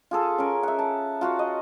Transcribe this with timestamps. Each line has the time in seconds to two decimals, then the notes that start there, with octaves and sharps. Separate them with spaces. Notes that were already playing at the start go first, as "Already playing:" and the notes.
0.11 F4 G#4 A4
0.38 C#4 A#4
0.63 E5 F#5
0.79 A5
1.21 F4 F#4 F#5
1.39 D#5